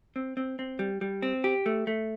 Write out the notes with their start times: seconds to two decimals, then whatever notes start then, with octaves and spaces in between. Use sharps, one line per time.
0.16 C4
0.37 C4
0.59 C4
0.79 G3
1.01 G3
1.22 C4
1.44 G4
1.66 A3
1.87 A3